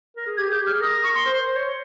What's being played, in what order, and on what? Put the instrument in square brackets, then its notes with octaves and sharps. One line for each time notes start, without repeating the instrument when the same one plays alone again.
[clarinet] A#4
G#4
[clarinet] G4 [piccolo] G#6
[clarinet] G#4 [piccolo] G6
[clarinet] G4
[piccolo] F6
[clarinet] G#4
[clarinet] A#4 [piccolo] D#6
[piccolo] D#6
C#6
C6
[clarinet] C5
C5
C#5